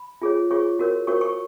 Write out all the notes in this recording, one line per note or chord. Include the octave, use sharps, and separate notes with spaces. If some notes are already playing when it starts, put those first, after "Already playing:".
Already playing: B5
F4 G#4 C#5
F4 G#4 C#5 C#6
F#4 A#4 C#5
F#4 A#4 C#5 C#6
C#6